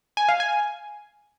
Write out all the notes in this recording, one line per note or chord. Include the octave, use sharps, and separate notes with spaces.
G#5
F5
G#5